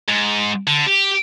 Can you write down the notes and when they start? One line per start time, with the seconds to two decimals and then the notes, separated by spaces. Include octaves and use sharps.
0.09 G#2
0.67 D3
0.87 G4